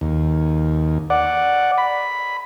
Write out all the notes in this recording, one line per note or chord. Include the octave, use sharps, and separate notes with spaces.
D#2
D5 F#5
B5